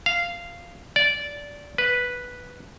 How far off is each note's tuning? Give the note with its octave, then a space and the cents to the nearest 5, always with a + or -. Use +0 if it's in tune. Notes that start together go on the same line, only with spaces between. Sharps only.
F5 -10
D5 -15
B4 -5